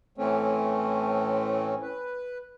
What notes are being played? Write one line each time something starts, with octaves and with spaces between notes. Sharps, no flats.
A2 E3 A3 C4 C#4
B4